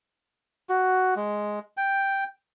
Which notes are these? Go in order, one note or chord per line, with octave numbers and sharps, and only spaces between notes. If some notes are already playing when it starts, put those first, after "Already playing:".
F#4
G#3
G5